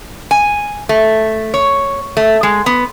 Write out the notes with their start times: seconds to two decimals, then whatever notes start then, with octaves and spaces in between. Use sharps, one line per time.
0.31 G#5
0.89 A3
1.54 C#5
2.17 A3
2.43 G#3
2.66 B3